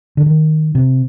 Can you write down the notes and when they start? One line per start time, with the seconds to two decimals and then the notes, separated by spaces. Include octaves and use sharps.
0.17 D3
0.26 D#3
0.75 C3